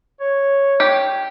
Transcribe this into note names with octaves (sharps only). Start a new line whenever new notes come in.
C#5
G4